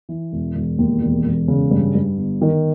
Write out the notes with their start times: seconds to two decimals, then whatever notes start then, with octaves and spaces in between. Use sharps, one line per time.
0.09 E3
0.32 E1
0.55 E1
0.78 D#2
1.02 E1
1.25 E1
1.48 C#3
1.71 G2
1.95 G2
2.17 G1
2.41 D#3